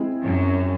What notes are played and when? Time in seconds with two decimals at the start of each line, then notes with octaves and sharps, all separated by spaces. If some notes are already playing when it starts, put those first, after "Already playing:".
Already playing: G#3 C4 E4 G#4
0.22 F#2